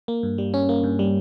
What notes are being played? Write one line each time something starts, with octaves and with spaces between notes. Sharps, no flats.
A#3
G2
G3
C#4
A#3
G2
G3